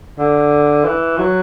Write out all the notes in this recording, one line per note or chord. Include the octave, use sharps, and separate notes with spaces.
D3
E3
F#3